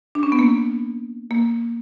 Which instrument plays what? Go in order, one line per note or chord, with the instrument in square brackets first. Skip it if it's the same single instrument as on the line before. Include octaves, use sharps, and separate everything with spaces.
[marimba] D4
C#4
B3
A#3
A#3